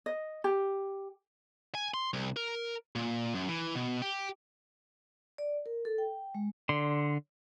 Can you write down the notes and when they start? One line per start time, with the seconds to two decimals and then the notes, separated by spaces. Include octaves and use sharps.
0.06 D#5
0.44 G4
1.75 G#5
1.94 C6
2.14 C2
2.36 A#4
2.96 A#2
3.35 F#2
3.49 E3
3.75 B2
4.02 G4
5.38 D5
5.66 A#4
5.85 A4
5.98 G5
6.35 G#3
6.69 D3 C6